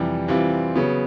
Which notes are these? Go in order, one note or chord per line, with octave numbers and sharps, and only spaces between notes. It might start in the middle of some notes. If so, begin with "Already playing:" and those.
Already playing: F2 C3 E3 G3
C3 E3 G3 C4 F4
C#3 F#3 B3